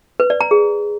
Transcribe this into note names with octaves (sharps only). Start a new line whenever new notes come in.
B4
D5
A#5
G#4